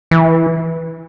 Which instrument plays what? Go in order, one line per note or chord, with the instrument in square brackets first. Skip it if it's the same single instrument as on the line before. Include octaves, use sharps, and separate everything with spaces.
[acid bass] E3